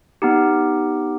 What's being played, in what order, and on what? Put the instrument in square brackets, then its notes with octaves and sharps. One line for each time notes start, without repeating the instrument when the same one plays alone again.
[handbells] B3 D#4 G4